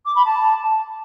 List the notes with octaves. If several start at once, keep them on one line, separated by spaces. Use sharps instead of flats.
D6
B5
A5